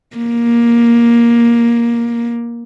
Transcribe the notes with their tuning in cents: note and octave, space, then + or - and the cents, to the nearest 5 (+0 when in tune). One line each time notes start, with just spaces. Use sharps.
A#3 +10